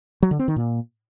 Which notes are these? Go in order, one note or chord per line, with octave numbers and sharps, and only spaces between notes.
F#3
D3
C4
D#3
A#2